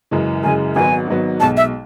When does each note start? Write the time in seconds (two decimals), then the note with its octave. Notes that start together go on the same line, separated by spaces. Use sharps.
0.11 F#2 C#3 E3 G#3
0.44 F#2 C#3 E3 G#3 G#5
0.75 G#1 G#2 F#3 B3 G#5
1.08 G#1 G#2 F#3 B3
1.40 B1 B2 G#3 A5
1.57 E5